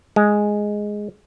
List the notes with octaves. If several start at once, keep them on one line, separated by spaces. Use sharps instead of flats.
G#3